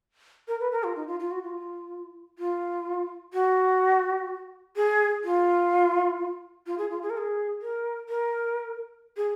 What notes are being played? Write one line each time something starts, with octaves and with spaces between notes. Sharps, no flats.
A#4
B4
A#4
F4
D#4
F4
F4
F#4
F4
F4
F#4
G#4
F4
F4
G#4
F4
G#4
A#4
G#4
A#4
A#4
G#4